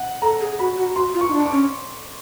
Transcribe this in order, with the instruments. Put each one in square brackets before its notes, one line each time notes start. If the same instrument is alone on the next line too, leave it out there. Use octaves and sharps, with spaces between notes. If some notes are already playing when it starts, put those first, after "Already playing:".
Already playing: [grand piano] F#5
[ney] A4 [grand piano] A#5
[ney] G#4
[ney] F#4 [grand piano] B5
[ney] F#4
[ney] F#4 [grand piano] C6
[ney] F4
[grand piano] C#6
[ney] D#4
D4
[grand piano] D6
[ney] C#4